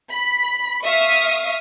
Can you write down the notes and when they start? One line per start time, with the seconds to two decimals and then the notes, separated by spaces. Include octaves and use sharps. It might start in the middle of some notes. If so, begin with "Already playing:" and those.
0.11 B5
0.83 E5 F5 C#6 D#6